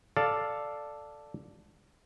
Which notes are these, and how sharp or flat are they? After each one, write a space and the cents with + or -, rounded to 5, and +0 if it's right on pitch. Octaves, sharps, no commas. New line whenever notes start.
A4 +0 D5 +0 F5 +0